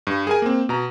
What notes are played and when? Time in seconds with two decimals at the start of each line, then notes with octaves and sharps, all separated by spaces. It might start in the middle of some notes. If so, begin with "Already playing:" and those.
0.07 G2
0.27 G#4 A#4 G#5
0.42 A#3 C4
0.69 B2 A#5